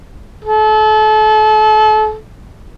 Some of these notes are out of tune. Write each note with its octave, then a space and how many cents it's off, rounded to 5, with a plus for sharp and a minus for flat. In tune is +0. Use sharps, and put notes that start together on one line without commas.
A4 -35